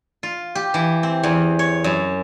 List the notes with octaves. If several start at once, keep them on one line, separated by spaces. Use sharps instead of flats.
F4
G4
E3
C4
E2
C#5
F#2